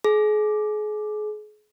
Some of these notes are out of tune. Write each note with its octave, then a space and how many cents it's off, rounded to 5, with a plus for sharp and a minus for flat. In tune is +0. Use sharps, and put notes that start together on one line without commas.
G#4 +35